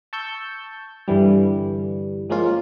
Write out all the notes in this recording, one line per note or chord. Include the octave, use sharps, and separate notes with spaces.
A5 C#6 E6 G6
G2 D3 E3 G3
F3 G#3 A#3 C#4 F4